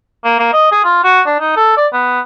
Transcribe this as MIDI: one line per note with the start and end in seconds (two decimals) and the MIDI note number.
0.24 0.36 58
0.39 0.52 58
0.53 0.70 75
0.72 0.80 68
0.84 1.00 65
1.04 1.21 66
1.26 1.37 62
1.40 1.55 63
1.57 1.73 69
1.77 1.87 74
1.93 2.20 59